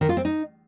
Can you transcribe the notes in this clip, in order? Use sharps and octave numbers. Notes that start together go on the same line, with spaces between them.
D#3
F4
C4
D#4